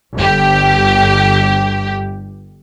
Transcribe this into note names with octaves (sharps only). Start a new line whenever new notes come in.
G1 G4